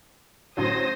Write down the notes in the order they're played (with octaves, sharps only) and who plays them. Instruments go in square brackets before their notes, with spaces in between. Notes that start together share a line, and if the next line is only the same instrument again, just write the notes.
[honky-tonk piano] A1 D3 F#3 [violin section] C5 D#6 A#6